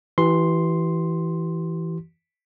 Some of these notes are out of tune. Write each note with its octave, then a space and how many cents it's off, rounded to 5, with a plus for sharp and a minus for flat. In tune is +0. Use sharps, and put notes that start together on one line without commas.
E3 +0 G4 -40 C6 +0